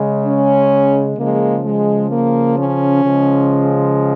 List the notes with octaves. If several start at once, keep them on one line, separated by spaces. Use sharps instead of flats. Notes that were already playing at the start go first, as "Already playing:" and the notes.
Already playing: C#3 G#3
C#4
C#3 F3 G#3 A#3
G#3
A#3
C#4
C#3 F3 G#3